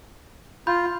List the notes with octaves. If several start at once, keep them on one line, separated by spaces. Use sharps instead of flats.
F4 B5 G6